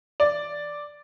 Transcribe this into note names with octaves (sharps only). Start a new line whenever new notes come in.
D5